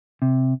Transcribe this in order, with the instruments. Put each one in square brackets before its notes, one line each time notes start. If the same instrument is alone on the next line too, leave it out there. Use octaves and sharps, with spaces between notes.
[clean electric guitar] C3